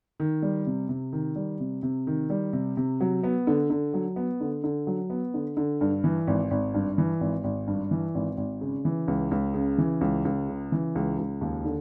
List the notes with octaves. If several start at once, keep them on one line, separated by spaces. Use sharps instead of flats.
D#3
G3
C3
C3
D#3
G3
C3
C3
D#3
G3
C3
C3
F#3
B3
D3
D3
F#3
B3
D3
D3
F#3
B3
D3
D3
G2
E3
G#1
G#1
G2
E3
G#1
G#1
G2
E3
G#1
G#1
C#3
E3
C#2
C#2
C#3
E3
C#2
C#2
C#3
E3
C#2
C#2
D#2
D3